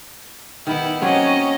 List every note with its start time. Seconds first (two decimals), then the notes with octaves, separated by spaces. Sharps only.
0.67 D#3 B3 E4
1.01 F#3 A#3 C4 C#4 D#5